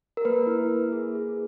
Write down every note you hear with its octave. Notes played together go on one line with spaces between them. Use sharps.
A#4
A#3 B4
E4
A#3
G#4
G#4